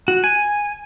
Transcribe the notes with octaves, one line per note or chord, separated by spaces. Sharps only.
F#4
G#5